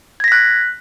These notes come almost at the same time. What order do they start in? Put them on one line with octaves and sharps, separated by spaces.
G#6 A#6 B6 F#6